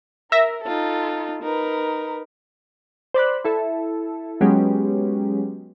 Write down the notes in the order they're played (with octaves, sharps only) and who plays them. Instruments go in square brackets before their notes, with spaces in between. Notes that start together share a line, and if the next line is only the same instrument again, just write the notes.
[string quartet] A#4 [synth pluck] E5 A#6
[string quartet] D#4 F4 A4
D#4 A#4 B4
[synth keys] C5 D5 B5 F#6
E4 A4 E5
F#3 G#3 B3 C#4 G4